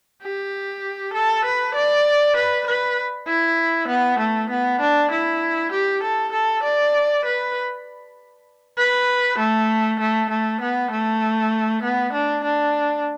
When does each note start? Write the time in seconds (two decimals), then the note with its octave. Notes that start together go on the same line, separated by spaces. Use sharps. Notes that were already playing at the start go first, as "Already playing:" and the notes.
0.23 G4
1.14 A4
1.45 B4
1.75 D5
2.37 B4
2.67 B4
3.27 E4
3.88 B3
4.19 A3
4.50 B3
4.81 D4
5.11 E4
5.72 G4
6.03 A4
6.33 A4
6.63 D5
7.25 B4
8.77 B4
9.38 A3
10.00 A3
10.30 A3
10.61 B3
10.91 A3
11.83 B3
12.13 D4
12.44 D4